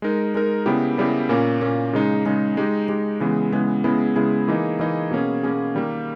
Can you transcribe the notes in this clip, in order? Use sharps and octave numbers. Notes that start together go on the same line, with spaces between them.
G#3 D#4 A#4
G#3 D#4 A#4
C#3 G3 B3 E4 G4
C#3 G3 B3 E4 G4
A#2 A#3 C#4
A#2 A#3 C#4
C#3 G#3 D#4
C#3 G#3 D#4
G#3 D#4 G4
G#3 D#4 G4
C#3 E3 G#3 B3
C#3 E3 G#3 B3
C#3 G#3 B3 E4 G#4
C#3 G#3 B3 E4 G#4
E3 A#3 D#4 G#4 D#5
E3 A#3 D#4 G#4 D#5
B2 A#3 C#4 G#4
B2 A#3 C#4 G#4
D#3 G3 A#3